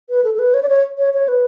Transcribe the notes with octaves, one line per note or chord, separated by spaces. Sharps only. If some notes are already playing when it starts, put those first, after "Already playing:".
B4
A4
A4
B4
C#5
D5
C#5
C#5
C#5
B4